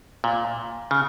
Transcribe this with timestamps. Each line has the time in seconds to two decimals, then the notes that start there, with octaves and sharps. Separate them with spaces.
0.24 A#2
0.91 C#3